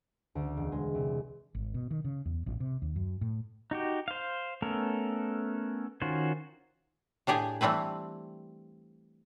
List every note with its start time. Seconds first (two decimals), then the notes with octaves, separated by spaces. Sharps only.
0.35 D2
0.57 E1
0.72 G#3
0.95 C2
1.55 G#1
1.74 B2
1.91 D#3
2.05 C#3
2.26 E2
2.46 A1
2.60 C3
2.82 D#2
2.96 F#2
3.21 A2
3.71 D#4 F#4 G4
4.08 C5 F5
4.62 A3 B3 C#4 A4 A#4
6.02 D#3 C#4 F4 F#4 C5
7.27 A2 D4 G4 G#4
7.61 E3 G3 A3 C4 B4